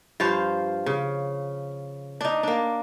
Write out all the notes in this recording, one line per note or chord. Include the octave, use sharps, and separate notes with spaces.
G2 F3 C5 F5
C#3
D4 D#4
A#3 D4